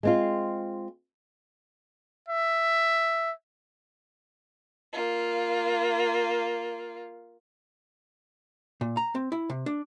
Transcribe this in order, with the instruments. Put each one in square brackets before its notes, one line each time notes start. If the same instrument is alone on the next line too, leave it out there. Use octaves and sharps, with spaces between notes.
[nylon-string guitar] G#3 C4 F4
[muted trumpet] E5
[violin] A#3 F4
[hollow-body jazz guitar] A#2
A#5
C4
E4
C3
D4